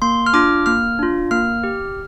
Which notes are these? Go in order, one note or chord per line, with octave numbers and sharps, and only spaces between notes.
A#3 C6
F6
D4 F4 D6
A#3 F6
D4 F4
A#3 F6
G4